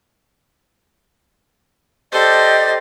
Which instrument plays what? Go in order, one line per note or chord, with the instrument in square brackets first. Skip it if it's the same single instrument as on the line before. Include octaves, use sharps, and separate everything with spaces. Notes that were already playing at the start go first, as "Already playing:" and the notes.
[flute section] G4 D5 D#5 [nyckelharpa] A4 C5